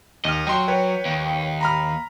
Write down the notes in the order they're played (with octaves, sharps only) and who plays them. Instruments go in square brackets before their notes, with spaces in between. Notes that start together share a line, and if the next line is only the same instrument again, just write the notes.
[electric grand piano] D#2 F6 [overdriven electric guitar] D#5
[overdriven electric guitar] F#3 [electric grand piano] G5 C6
[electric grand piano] B4 C#5 G5
[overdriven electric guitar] D#2
[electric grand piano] A#5 B5 F6